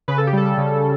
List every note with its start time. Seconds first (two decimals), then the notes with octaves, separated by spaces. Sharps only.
0.08 C#3 B4
0.18 A4
0.27 G4
0.33 G3 A4
0.58 C#3